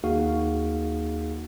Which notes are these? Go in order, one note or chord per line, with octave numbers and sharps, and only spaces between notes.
D#2 A#3 D#4 F#4 G#4 F5